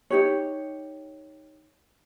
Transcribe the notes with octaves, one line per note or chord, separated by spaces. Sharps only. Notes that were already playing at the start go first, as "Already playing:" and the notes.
D#4 G4 C#5